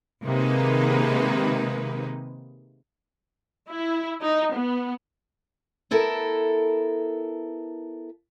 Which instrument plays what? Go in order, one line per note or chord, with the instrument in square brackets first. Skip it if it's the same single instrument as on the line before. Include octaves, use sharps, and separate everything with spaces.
[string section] C3 D#3 G#3 A#3 D#4 B4
[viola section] E4
D#4
B3
[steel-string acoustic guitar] B3 E4 A4 A#4